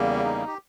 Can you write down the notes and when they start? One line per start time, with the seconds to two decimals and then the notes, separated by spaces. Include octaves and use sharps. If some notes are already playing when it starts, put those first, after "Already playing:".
Already playing: E2 C#3 G3 A#3
0.24 D#4
0.47 G4